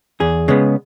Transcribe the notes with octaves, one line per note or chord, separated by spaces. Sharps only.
E2 G#4
C#3 G#3 B3